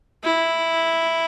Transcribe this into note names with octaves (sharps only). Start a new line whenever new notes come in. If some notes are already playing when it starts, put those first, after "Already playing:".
E4